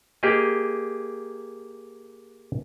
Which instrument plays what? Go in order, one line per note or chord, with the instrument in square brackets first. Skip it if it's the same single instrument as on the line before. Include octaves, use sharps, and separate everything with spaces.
[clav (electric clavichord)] A#3 G4 G#4 D#5